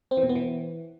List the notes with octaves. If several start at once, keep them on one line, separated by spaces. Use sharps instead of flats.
C4
E3
B2
B3
E3